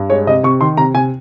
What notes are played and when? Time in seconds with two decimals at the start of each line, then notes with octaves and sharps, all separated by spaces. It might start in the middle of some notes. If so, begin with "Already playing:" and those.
Already playing: G2
0.09 G#3 C#5
0.27 C3 D#5
0.43 C3 C#6
0.60 D#3 C6
0.77 C3 A#5
0.94 C3 G#5